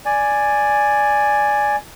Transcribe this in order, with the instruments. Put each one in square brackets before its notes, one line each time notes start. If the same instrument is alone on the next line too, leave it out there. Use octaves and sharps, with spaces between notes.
[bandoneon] D5 G#5